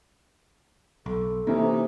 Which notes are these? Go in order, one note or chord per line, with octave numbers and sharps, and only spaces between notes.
B1 A4
C3 E3 A#3 C#4 D#4 E4